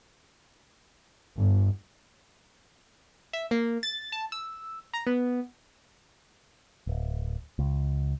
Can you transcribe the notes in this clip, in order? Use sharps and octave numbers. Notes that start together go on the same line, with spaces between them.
G1
E5
A#3
A6
A5
E6
A#5
B3
D1
C#2